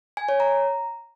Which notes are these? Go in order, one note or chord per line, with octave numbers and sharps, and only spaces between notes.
G#5
C#5
A#5